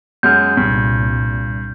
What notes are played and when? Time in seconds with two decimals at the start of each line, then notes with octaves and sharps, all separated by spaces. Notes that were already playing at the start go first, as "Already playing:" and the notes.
0.23 F#2 G#3 F6 G6
0.57 C2 G2 A#2